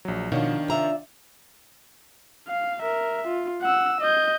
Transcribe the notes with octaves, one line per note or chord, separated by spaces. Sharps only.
A#1 F#3
B2 D#3 F3 D4 C#5 F5
C3 F4 D5 E5 A#5
F5
A#4 E5
F4
F#5 E6
D#5 G6